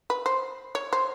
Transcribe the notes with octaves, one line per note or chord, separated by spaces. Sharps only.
B4
C5
C#5
C5